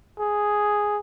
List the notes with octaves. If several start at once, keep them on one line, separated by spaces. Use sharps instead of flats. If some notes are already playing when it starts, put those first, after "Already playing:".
G#4